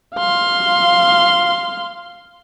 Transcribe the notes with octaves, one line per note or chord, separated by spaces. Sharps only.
F5 C6